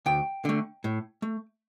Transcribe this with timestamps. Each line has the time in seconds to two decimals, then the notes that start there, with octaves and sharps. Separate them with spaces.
0.06 D2 G5
0.45 D3 A3
0.84 A2
1.22 A3